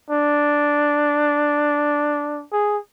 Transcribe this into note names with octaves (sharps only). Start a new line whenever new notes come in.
D4
G#4